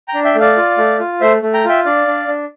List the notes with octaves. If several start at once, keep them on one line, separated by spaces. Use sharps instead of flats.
G5 A#5
D4
E5 G5
A3
D5 F5
F4
A3
F4
A3 C5 E5
A3
G5 A#5
F4 E5 G5
D4 D5 F5
D4
D4